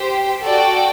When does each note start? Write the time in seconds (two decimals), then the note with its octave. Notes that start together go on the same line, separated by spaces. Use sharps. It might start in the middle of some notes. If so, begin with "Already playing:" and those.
Already playing: G4 C5 G5
0.42 F#4 A4 D5 G5